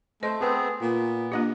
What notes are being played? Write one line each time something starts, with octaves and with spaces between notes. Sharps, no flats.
A3 C5 D#5
B3 C4 G#4 A4 B4 C5
A#2 B3
A#3 D4 F4 G4 D#5